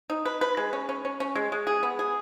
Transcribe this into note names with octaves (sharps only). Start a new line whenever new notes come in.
D#4
B4
B4
G#3
C#4
C#4
C#4
C#4
G#3
G#3
G#4
B3
G#4